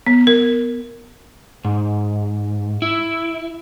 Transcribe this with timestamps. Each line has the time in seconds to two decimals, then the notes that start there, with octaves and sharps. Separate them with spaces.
0.06 B3
0.27 A#4
1.65 G#2
2.82 E4